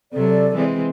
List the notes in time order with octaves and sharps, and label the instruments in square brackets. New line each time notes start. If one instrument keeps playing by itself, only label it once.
[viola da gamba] C3 F#3 [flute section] A4 D5
[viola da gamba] E3 G#3 C4